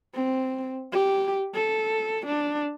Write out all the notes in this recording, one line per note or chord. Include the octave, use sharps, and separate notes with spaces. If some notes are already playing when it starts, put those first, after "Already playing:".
C4
G4
A4
D4